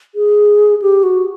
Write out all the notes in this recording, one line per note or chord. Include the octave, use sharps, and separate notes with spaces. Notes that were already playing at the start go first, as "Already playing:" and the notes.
G#4
G4
F#4